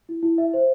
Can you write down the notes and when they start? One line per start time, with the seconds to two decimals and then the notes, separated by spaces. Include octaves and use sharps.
0.09 E4
0.23 E4
0.38 E5
0.54 C5